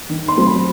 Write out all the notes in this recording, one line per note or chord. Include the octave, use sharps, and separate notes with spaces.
D#3
C6
F#3 A3 C4
B5